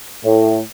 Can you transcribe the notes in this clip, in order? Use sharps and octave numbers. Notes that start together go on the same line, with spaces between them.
A2